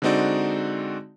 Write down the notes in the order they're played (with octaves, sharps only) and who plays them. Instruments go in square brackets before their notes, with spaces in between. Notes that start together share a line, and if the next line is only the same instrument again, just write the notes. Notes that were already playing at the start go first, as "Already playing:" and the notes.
[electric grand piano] D3 G#3 C4 D#4 F#4 D5